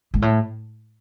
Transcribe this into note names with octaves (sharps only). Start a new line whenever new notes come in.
G#2
A2